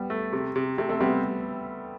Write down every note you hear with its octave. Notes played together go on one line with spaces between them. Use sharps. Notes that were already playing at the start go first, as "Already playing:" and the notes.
Already playing: G3 B3
A3
C3
C3
C3 A3 C4
A3 C4
C3 G3 B3